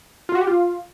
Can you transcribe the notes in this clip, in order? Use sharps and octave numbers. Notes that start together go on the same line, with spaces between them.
F4
F#4
G4
F4